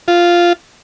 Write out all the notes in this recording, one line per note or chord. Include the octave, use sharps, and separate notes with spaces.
F4